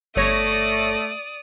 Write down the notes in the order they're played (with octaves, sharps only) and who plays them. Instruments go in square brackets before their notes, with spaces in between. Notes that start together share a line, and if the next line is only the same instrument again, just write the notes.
[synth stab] G1 C#5 A#6 [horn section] A3 [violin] D5 D#6